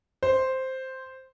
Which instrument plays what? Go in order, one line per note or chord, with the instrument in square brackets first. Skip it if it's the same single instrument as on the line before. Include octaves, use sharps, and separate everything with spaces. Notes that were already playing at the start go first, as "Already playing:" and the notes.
[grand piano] C5